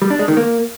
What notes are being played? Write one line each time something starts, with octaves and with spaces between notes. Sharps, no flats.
G3
D4
G#3
D#3
A#3